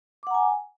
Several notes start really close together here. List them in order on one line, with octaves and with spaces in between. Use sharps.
D6 F#5 A#5 G#5